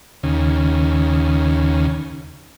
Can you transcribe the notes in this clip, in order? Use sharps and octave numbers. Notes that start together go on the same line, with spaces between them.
D#2 C#3